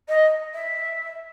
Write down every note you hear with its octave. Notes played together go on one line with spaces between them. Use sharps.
D#5
E5